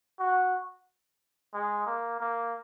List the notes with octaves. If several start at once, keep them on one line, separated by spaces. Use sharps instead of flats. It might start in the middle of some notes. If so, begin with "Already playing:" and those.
F#4
G#3
A#3
A#3